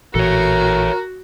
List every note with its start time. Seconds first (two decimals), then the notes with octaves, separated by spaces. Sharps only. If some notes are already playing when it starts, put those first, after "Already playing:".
0.15 A1 A#2 E3 F#4 A4 A#4 C#5